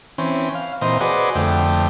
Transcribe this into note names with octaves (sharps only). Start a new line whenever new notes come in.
E3 C4 C#4
F5
A#2 E3 C4 C5 D#5
F#4 G#4 B4 C5 D5 D#5
F2 D3 A3 G5